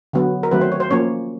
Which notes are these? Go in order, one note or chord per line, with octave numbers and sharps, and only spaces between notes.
D3 F#3 B3
A#4
D#3 F#3 A3 C4 B4
C5
C#5
C5
F3 A#3 C#4 C#5